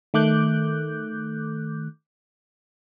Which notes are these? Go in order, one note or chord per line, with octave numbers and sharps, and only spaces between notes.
D#3 A3 D6 F#6 G6